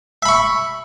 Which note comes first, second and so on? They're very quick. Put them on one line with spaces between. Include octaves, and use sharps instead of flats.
E5 B5 C#6